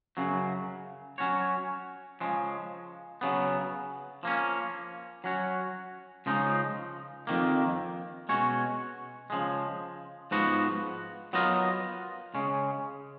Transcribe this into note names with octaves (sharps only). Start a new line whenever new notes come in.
F#2 C#3 F#3
F#3 C#4 F#4 C#5
C#3 F3 G#3
C#3 F#3 B3
F3 A#3 C#4
F#3 C#4 F#4 C#5
C#2 C#3 F3 G#3 D#4
F2 D#3 A#3
B2 G#3 C#4 F#4 C#5
C#3 F3 G#3
G#2 F3 B3 F#4
F#3 B3 F4 A#4 D#5
C#3 G#3 C#4